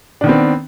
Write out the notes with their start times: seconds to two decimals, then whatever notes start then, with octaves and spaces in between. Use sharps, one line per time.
0.21 D4
0.24 D#3
0.26 B3
0.29 C4